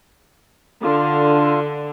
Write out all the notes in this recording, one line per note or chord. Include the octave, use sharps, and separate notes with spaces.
D3 F4